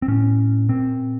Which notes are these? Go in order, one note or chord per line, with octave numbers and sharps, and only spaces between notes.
C4
A2 C#4
A#2 C4